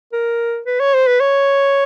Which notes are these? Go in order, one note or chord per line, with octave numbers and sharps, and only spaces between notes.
A#4
B4
C#5
C5
B4
C#5